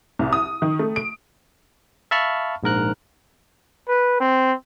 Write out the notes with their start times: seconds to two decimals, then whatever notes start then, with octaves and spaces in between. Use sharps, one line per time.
0.19 C2
0.33 D#6
0.62 D#3
0.79 A3
0.96 D7
2.11 E5 F5 A5 B5 C#6 F6
2.63 A#1 G#2 A#4 F#6
3.88 B4
4.20 C4